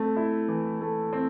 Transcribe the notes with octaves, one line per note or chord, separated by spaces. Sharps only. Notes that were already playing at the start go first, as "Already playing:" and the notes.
Already playing: A3 C4
E4
E3
A3
C4